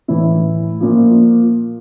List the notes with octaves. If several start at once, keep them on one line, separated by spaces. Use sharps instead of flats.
A2 E3 E4
A#2 F3